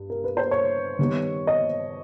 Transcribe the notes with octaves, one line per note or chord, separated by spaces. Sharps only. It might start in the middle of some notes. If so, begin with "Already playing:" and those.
Already playing: G2
A#4
B4
C5
C#5
D#3 G3 B3 D#4
D#5